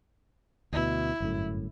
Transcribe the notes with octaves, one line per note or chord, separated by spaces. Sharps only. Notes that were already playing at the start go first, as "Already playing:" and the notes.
D2 B2 E4
G1 F#2 A2